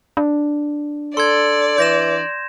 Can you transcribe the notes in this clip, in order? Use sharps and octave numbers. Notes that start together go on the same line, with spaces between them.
D4
A4 D5 C6 G#6
E3 G6 A#6 E7